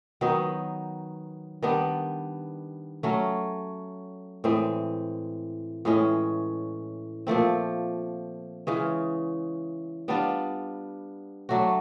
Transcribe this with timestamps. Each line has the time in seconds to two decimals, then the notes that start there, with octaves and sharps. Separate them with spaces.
0.21 D#3 F#3 B3 D#4
1.62 D#3 G3 B3 D4
3.03 F#3 A3 C#4
4.44 A2 E3 G#3 C4
5.85 A2 E3 G#3 C#4
7.27 A#2 F3 A3 C4
8.67 C#3 E3 G#3 C#4
10.08 G3 B3 D4 F4
11.49 F#3 A3 D4 F#4